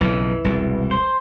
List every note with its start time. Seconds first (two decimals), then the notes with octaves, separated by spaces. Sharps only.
0.01 B1 F2 C#3 E3
0.44 E1 C2
0.91 C5